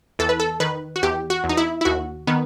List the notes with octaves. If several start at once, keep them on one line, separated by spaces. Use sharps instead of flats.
E2 A4
B4
A4
D#3 B4
F#4
E2 G4
F#4
E2
D#4
E4
E4
D#2 F#4
D#3 B3